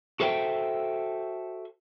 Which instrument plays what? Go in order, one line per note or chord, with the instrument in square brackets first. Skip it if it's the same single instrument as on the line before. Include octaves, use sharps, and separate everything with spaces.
[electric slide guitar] F#4 A4 C5 E5 G5